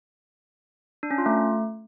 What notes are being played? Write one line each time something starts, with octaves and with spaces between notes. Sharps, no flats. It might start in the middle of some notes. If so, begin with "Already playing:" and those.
D4
C#4
F4
A3